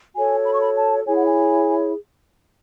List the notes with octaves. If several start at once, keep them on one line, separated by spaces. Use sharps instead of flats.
F#4 A4 C#5 G#5
B5
C#6
B5
A5
E4 G#4 C#5 G#5
F#5
G#5